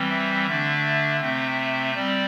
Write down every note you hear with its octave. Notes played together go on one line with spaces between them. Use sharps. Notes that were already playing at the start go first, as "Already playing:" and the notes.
Already playing: E3 G3 C4
E5
D3 A3 D4 E5
C3 A3 C4 E5
G3 C4 D5